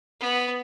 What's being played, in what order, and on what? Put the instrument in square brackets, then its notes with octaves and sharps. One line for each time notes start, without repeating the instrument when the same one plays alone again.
[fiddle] B3